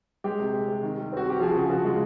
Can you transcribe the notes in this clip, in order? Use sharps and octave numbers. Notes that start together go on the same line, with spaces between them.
G#3 G4
C3
C3
C3
D#3
G3
C4 F#4
G3 G4
F3 F#4 G#4
C#3
F3 F#4
G#3